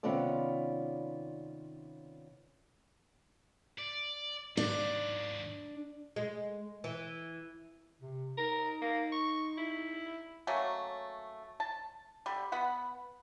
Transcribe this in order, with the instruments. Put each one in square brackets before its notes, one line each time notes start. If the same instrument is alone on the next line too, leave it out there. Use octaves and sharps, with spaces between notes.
[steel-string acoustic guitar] C3 D#3 B3 C#4 F4 D5
[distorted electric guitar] D5
[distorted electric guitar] D#2 G#2 [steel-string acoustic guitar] D4
[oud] G#3
E3
[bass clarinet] C3
[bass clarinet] D#4 [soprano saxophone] A#4
[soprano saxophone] A#3
C#6
E4
[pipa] F#3 A3 A#3 C#4
A5
D3 G3
B3 F#5 B5